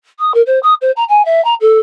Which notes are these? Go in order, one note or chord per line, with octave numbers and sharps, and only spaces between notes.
D#6
A#4
C5
D#6
C5
A#5
G#5
E5
A#5
A4